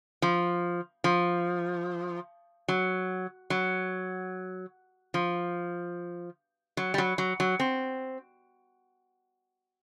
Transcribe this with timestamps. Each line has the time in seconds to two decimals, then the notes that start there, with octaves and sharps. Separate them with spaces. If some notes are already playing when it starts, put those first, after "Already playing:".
0.22 F3
1.04 F3
2.68 F#3
3.50 F#3
5.14 F3
6.77 F#3
6.94 G3
6.98 F#3
7.18 F#3
7.40 F#3
7.60 C4